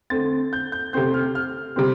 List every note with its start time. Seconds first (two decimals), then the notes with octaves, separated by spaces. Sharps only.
0.10 D3 A3 C4 A6
0.53 G6
0.72 G6
0.93 C3 A3 C4 G6
1.14 F6
1.35 F6
1.76 C3 G3 C4